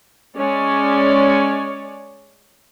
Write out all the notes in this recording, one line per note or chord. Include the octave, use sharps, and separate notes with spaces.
G#3 C#4 C#5 D5